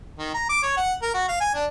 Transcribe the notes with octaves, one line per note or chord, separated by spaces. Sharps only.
D#3
A#5
D6
C#5
F#5
A#4
F#4
F5
G#5
D4